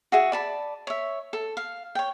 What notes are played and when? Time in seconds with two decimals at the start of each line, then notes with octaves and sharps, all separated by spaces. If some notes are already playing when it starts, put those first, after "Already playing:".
0.12 F#4 G#4 E5 F#5
0.32 D5 A5 B5
0.87 C#5 E5
1.33 A4
1.57 F5
1.95 C#5 G5